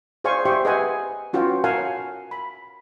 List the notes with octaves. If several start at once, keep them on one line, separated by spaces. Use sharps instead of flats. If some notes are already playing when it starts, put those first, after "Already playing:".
G#4 C5 D5 F5 G#5 C#6
G4 C5 E5 G5 C6 C#6
G#4 B4 D#5 E5 F#5 G#5
C#4 F4 F#4 B4 G5
A#4 C#5 F5 F#5 G#5 A5
B5